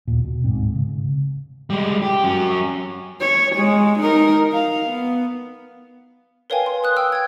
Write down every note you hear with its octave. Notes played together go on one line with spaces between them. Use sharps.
D#2 A#2
B2
D1 G#2 C4
C#3
G3 G#3
G4
F#3 C#4
C#5
G#3
D#4 A#4
F5
B3
A#4 B4 C#5 F5 G5 G#5
C6
B4 D#6 F#6
G5 E6 F6
G5 G#6